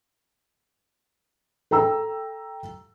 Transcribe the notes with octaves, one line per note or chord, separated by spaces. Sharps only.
A4 G5 A#5 E6